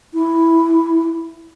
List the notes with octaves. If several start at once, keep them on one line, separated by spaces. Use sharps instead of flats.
E4